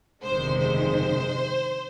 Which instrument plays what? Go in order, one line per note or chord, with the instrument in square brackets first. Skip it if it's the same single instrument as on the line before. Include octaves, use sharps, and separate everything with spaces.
[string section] G1 F2 C3 D#3 G#3 C5
C5